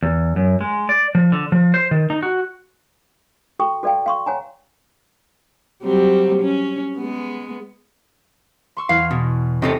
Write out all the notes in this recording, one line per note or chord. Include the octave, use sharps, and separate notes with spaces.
E2
F#2
G#3
D5
F3
D3
F3
C5
D#3
D#4
F#4
F#4 A4 G5 C#6
F#4 A4 D5 F5 G5
F5 C6 C#6
C#5 F#5 G#5 A#5
F#3 G3 C4
C#4
G#3 B3
C6 C#6 E6
E2 F5 F6
B2
C3 C4 G4 A4 D#5 C#6